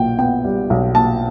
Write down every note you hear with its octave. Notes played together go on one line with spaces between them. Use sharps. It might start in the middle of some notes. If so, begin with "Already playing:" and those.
Already playing: B1 A#2 G5
B3 G5
G3
B1
A#2 A5